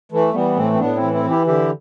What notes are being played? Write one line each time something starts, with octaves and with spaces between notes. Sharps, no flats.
E3 A3
E3 G3 B3
A2 A3 C4
C4
A2 B3 D4
C4 E4
E3
C4 E4
E3
E4 G4
D3 E4 G4